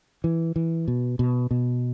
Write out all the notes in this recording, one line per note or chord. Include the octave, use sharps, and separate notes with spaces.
E3
E3
B2
B2
B2